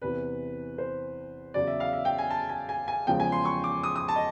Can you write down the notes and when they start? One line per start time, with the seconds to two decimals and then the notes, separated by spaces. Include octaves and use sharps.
0.02 E2 C3 E3 B4
0.78 C5
1.54 E2 C#3 F#3 D5
1.67 E5
1.80 F5
1.93 E5
2.05 G5
2.18 G#5
2.30 A5
2.49 G#5
2.69 G#5
2.88 G#5
3.07 E2 C#3 F3 G#3 G5
3.20 G#5
3.32 C6
3.45 C#6
3.64 D6
3.83 D#6
3.96 D#6
4.08 A5
4.16 D#5